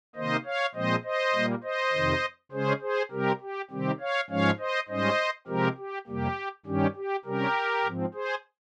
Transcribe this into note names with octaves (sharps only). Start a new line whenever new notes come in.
C3 D#3 A#3 C5 D#5
C#5 F5
A#2 F3 G#3 C4 C5 D#5
C5 D#5
A#2 G3 A#3
C5 D#5
F2 C3 D#3
C#3 G#3 C#4 G#4 C5
G#4 C5
C3 G3 C4 G4 A#4
G4
C3 D#3 G3 C4 G4
C#5 F5
G#2 F3 G#3 C#4 C#5 F5
C5 D#5
G#2 G3 C#4 C5 D#5
C3 F3 G#3 C4 G4 A#4
G4
F2 C3 G3 A#3 G4
G2 D#3 G3 C#4 G4
G4
C3 G3 C#4 G4 A#4
G#2 F3 C4
G#4 C5